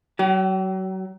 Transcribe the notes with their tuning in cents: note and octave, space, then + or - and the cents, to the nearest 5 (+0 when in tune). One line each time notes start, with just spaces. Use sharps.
F#3 +30 G4 -40